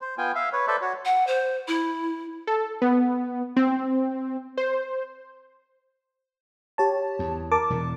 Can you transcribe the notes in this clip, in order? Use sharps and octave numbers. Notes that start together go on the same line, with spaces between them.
C5
B3 F4 G5 G#5
E5 F5
B4 C#5
A4 B4 C5 D5 E5
F#4 C#5
F#5
C5
E4
A4
B3
C4
C5
G4 C#5 A5
E2
A#4 A5 D6
E1 E2 B2